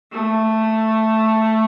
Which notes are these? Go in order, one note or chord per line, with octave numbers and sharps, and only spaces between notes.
A3